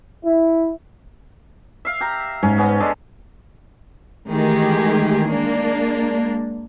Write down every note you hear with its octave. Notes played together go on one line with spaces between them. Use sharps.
E4
E5 F5
G4 A#5
G#2 C#4
B3 C#4 D#5
G#3 D4 A4
D#3 E3 G#3 A3 G4 G#4
G#3 A#3 D4